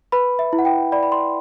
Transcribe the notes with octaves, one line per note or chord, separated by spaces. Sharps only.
B4 B5
E5
E4
F#5
G5
D5 B5
B5
C6